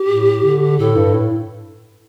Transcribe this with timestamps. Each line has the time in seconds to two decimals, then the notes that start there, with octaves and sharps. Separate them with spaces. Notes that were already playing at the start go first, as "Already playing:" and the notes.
Already playing: G4
0.08 A2
0.44 D3
0.79 A2 A4
0.96 G2
1.14 A2